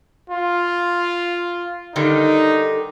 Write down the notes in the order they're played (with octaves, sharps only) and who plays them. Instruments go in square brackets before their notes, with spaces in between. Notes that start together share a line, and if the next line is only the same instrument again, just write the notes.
[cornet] F4
[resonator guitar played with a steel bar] D3 D#3 G3 [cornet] D#4